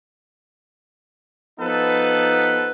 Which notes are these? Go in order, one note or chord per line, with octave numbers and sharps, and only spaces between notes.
F3 B3 D#4 A4 B4